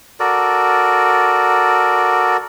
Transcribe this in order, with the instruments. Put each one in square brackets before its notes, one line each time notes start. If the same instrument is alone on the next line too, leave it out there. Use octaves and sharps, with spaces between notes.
[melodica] F#4 A4 A#4 D5